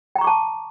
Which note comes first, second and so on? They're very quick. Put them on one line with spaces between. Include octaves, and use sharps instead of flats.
G5 A#5 C#6 D6 A5